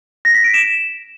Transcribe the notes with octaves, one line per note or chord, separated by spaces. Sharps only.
A#6
B6
D7
E7